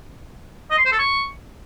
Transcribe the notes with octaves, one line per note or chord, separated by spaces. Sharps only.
D#5
C6
C5
A4
C#6